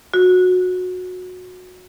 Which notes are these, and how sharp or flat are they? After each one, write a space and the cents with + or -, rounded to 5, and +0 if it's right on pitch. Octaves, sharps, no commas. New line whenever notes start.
F#4 -20